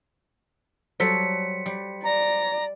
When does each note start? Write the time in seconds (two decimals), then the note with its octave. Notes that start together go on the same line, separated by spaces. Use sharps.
1.00 F#3 G3 A4 C5 B6 C#7
1.66 G3
2.04 D5 A#5